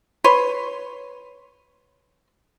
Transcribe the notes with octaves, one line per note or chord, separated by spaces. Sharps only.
B4 C#5 C6